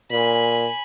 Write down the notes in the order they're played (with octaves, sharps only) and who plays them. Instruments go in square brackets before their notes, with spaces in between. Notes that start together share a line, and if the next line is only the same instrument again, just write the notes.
[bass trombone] A#2 [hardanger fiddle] G#5 B5